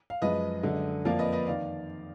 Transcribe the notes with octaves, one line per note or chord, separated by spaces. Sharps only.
F5
F#2 F3 G#3 B4 D#5
F#2 D3 G#3
F2 F3 A#3 D5 F5
B4 D#5
B4 D#5
D#3 D5 F5